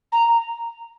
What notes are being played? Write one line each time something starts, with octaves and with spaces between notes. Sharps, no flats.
A#5